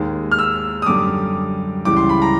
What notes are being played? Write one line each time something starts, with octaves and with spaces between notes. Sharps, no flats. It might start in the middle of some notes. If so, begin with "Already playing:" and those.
Already playing: D#2 D#3 G#3
F6
E6
D#6
F#2 D3 G3 D6
C#2 C#3 E3 G3 D6
C6
B5
A#5